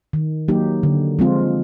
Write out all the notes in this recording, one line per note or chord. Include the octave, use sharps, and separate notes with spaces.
D#3
F#3 A#3 D#4 G4
D3
F3 G#3 C4 F4